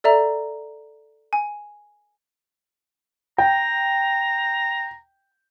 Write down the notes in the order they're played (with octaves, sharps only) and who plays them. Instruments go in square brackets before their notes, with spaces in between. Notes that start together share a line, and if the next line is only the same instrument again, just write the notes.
[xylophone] A4 D5 E5 A#5
G#5
[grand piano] G5 [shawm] A#5